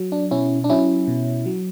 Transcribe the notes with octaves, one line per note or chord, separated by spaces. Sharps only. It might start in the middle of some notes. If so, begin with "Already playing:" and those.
Already playing: F#3
D4
B2 C#4 E4
D4
F#3 C#4 E4
B2
F#3